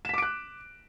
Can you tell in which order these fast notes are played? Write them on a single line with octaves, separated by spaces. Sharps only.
E7 B6 D6 D7 F#6